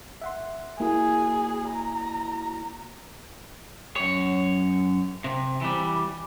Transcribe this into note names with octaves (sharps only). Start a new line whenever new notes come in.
E5 F#5 C6
A#3 E4 F#4 G#4
A#5
F#2 C#5
C3
E3 G3